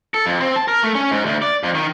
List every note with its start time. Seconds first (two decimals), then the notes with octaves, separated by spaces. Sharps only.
0.14 A4
0.26 F2
0.40 C4
0.56 A5
0.68 A#4
0.83 A3
0.95 C#4
1.11 G#2
1.26 D2
1.42 D5
1.63 F2
1.75 D#3